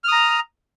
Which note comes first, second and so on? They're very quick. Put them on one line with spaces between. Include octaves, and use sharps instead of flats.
F6 D#6 A#5